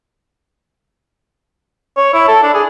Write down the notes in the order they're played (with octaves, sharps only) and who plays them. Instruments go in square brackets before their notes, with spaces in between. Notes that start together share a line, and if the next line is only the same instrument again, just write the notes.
[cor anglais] C#5
E4
A4
D4
G#4